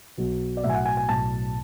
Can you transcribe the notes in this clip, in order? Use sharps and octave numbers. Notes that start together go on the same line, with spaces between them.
B1 B2 F#3
D5
B1 A2 F#3 E5
G#5
F#5
G#5
G#5
B1 A2 F#3 A5